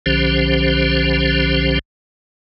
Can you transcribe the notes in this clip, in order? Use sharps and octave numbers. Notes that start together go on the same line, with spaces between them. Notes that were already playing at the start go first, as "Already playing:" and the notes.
B1 D3 F3 C#4 G4 C5